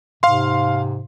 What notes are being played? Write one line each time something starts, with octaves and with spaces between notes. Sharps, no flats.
G#2 C3 F5 C6